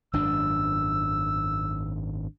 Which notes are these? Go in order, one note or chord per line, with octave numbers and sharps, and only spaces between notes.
G#1 F#2 D4 E6